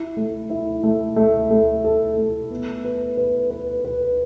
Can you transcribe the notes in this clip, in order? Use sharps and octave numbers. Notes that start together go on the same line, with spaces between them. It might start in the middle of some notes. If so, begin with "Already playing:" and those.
Already playing: E4
A3
E4
A3
A3
A3
A4
A3
B3
B4
B4
B4
B4